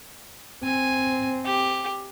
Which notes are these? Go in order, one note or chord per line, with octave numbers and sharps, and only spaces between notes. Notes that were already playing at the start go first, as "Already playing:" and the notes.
C4 G#5
G4